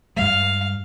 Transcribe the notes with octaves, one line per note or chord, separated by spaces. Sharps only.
G2 G3 G#3 F5